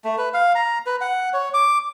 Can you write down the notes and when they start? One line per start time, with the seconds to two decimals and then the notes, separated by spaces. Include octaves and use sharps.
0.04 A3
0.18 B4
0.34 F5
0.55 A#5
0.86 B4
1.01 F#5
1.33 C#5
1.54 D6